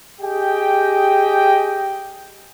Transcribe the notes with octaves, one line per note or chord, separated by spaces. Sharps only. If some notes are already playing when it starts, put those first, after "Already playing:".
G4 G#4 D#5 G5